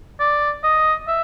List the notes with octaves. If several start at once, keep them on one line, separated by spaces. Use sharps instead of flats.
D5
D#5
E5